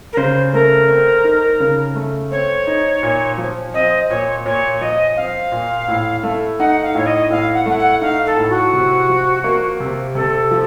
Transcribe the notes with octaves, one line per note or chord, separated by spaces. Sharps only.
A#4
C#3 C5
A3 A#4
C4
D#4
C#3
A3
C4 C#5
D#4
A#2
F3
C4 D#5
A#2 C#5
A#2 C#5
C#5
F3 D#5
C4 F5
A#2
A2
A3
D#4 F#5
F5
A2 C#5
D#5
A2 F5
F#5
A3 F#5
F#5
D#4 F5
A4
A2
F#4
C3
F3
A#3
C3
C3 A4
F3